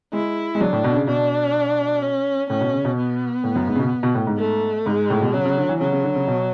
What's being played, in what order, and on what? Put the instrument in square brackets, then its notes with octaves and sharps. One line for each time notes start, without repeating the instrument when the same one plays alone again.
[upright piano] G#3 [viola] E4
[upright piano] G#3
[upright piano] F#3 [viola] D4
[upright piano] A2
B2
D3
C#3
[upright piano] B2 [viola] D4
[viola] C#4
[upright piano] A2 [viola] C#4
[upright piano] B2
C#3
B2
[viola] B3
[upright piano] A2
F#2
G#2
C#3
B2
B2
A2
G#2
[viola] A3
[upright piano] G#2 [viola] G#3
[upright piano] A2
B2
[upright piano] C#3 [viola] F#3
[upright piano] C#3
D3
E3
[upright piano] C#3 [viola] F#3
[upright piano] C#3
D3
C#3
B2